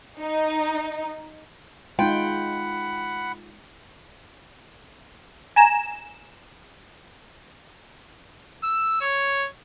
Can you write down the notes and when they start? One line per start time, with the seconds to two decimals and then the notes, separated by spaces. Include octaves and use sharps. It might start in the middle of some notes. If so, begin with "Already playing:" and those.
0.20 D#4
1.99 G#3 D#4 F4 F#5 G5 B5
5.56 G#5 A#5 E7
8.64 E6
9.01 C#5